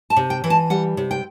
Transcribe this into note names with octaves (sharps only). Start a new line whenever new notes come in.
A5
C3
G5
E3
A5
G3 F#5
C3
G5